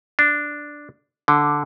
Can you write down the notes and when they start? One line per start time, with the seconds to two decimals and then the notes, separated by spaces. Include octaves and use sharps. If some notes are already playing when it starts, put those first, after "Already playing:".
0.19 D4
1.28 D3